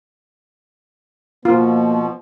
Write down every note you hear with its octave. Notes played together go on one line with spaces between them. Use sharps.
B2 F3 A#3 F4